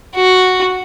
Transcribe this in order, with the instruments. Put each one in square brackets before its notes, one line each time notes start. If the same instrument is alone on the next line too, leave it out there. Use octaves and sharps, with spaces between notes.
[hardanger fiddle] F#4